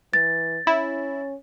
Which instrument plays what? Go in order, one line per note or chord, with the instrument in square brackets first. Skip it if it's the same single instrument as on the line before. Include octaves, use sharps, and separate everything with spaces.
[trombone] E3 [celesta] A6
[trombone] C#4 [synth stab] E4